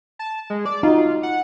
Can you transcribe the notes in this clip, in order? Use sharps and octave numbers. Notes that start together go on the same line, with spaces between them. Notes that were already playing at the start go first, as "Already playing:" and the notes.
A5
G#3
D5
D#4 F4 F#4
F#5